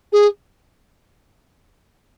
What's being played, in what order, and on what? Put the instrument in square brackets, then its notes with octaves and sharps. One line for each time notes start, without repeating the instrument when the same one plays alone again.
[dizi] G#4